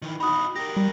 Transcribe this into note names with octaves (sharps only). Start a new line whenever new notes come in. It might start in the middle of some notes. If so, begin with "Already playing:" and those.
D#3 E3
D#4 F#4 B5 D#6
G4 A#4 A#6
G3